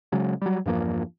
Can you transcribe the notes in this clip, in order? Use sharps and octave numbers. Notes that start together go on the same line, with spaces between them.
C#3 F#3 G#3
F#3 G3
E2 G2 F3 A#3